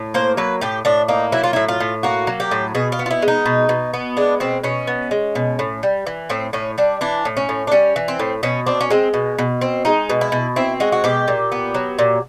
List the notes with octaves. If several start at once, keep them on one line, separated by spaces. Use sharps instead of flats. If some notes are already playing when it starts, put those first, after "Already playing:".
Already playing: A2
A#3 C5
F#3 B4
A2 G4
A2 D4
A#3 D#4
F#3 E4
F4
A2 E4
F4
A2
A#3 F#4
F#3
G4
A2
B2 G#4
F4
B3
F4
E4
G#3
D#4
B2
B2
B3
G#3 D4
B2 C4
B2 C#4
B3
G#3
B2
A2
G3
E3
A2 C4
A2 C#4
G3 D4
E3 D4
A2
C#4
A2
D4
G3 C#4
E3
C4
A2
B2 C#4
C4 D4
C#4
G#3 C4
B2
B2
C4
G#3 D#4
B2
E4
B2
C4 E4
G#3 F#4
F#4
B2 G4
A#2
B3
F#3
A#2